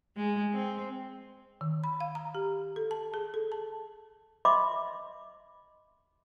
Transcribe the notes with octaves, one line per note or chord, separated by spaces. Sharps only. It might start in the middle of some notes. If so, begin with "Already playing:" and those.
G#3
C4
D#3
B5
F5
A#5
G4
A4
A5
G#4
A4
A5
D#5 E5 B5 C6 D6